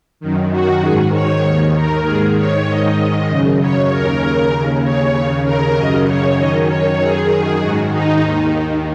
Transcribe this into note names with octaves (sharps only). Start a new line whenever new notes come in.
F#2 D#3
F#4
D#3 G#4
G#2
C#5
D#2 D#3 C#5
A#4
G#2 D#3 G#4
C#5
G#2 D#3 D#5
F#2 C#3
C#5
D#2 C#3 A#4
D#2 C#3
C#5
D#2 C#3 C#5
A#4
F#2 C#3 D#5
C#5
F#2 D#3 D#5
C#5
F#2 D#3 G#4
G#2 D#3 F#4
D#4
D#2 D#3